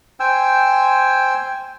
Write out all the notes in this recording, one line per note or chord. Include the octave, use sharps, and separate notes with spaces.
C5 G5 G#5 E6